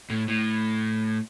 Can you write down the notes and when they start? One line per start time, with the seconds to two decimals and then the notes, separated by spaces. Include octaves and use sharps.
0.10 A2
0.28 A2